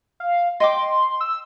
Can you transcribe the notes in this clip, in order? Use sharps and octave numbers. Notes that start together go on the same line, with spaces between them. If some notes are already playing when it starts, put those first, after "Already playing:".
F5
D#5 G5 C6 D6
E6